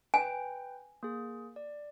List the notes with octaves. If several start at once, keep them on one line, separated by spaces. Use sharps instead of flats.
B4 G5 G#5
A#3 G#4
D5